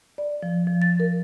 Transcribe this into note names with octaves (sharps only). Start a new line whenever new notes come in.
D5
F3
F3
A6
A#4